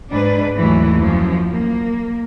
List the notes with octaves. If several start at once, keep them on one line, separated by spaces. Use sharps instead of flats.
G#2 D4 B4
D#2 A2 E3 F#3 A3
F#2 F3
A#3